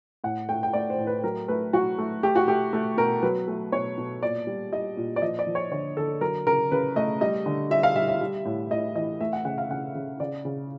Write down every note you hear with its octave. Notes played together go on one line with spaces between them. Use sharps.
A2 F#5
A3 G5
G5
A3 D5
C5
A2
B4
F#3 A#4
A3 B4
F#3 F#4
A3
A3 G4
F#4
A3 G4
A3
B2 A#4
F#3 B4
A3
B2 C#5
B2
A#2 D5
G3
G3 D#5
A#2
D5
F3 D#5
D5
F3
C#5
D3 C#5
D3 A4
F#3 A#4
C#3 A#4
C#3 B4
A3 D#5
G3 D#5
D3
G3 E5
F5
G3 E5
E5
G3
A2
A2 D#5
E3 D#5
A3 E5
F#5
C#3 F#5
F5
C#3 F#5
C#3
C#3 D5
C#3